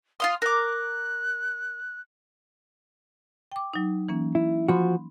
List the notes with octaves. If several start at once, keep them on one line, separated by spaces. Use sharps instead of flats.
F4 F5 C6 D#6
A#4 D6 F#6
G5 D6
F#3 D#4
E3 A#3 C#4
E4
F3 F#4 B5 C6